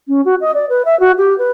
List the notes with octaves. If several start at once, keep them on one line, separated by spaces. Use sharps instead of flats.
C#4
F#4
D#5
D5
B4
E5
F#4
G4
B4